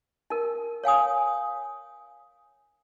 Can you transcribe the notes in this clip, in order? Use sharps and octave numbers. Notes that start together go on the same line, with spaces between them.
D#4 A#4
C#5 F5 G#5 D#6